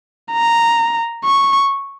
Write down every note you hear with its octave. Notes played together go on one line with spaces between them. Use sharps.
A#5
C#6